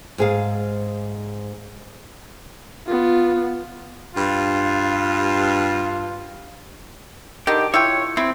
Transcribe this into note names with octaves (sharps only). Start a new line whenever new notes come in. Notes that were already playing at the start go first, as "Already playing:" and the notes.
G#2 G#4 F5
B3 F4
G2 F4
D3 D#3 G4
E4 F4 C#5 G5
C4 E4